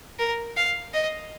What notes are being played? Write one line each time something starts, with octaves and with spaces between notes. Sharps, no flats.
A#4
F5
D#5